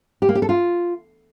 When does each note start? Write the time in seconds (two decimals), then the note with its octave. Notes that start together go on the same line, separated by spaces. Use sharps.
0.22 G4
0.29 A#3
0.35 G4
0.42 A4
0.49 F4